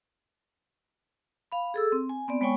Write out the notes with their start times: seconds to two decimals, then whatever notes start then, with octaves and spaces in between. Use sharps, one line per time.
1.52 F5 B5
1.74 G#4 A4 E6
1.92 C4
2.09 G#5
2.28 B3 C4 D5
2.41 G#3 B3 C#5 G5 G#5 C#6